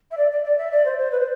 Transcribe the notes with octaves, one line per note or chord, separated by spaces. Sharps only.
E5
D5
D5
D5
E5
D5
C5
C5
B4
C5